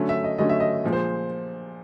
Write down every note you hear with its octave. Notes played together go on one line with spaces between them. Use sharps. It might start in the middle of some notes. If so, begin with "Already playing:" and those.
Already playing: D3 F#3 A3 C#4
E5
D#5
D3 F#3 A3 C#4 D#5
E5
D#5
A#2 F3 G#3
C5